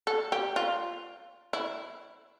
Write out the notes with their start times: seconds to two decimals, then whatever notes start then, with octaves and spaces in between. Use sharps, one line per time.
0.07 A4
0.32 G4
0.56 F4
1.53 E4